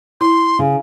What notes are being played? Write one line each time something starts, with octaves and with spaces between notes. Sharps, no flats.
E4 C6
C#3